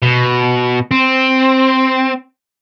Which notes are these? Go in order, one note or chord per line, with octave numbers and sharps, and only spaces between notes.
B2
C4